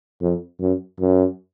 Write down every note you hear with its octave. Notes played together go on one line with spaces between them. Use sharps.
F2
F#2
F#2